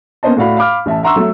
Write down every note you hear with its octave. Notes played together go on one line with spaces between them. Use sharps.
A#3 B3 C#4 C5 D#5 A5
A2 A3 F#4 D5 F5 B5
F5 B5 D6 F6
A1 E5 A5
E5 F#5 A#5 C6 C#6 E6
F#3 A3